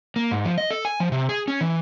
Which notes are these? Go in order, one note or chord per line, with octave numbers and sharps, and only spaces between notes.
A#3
G#2
F3
D#5
A4
G#5
F3
C3
G#4
C#4
E3